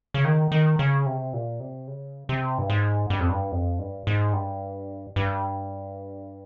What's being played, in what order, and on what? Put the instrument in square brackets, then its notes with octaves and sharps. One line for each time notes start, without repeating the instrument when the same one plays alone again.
[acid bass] C#3
D#3
D#3
C#3
C3
A#2
C3
C#3
C3
G2
G#2
G2
F2
G2
F2
G2
G#2
G2
G2